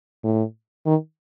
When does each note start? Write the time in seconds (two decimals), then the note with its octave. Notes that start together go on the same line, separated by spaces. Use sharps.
0.24 A2
0.86 D#3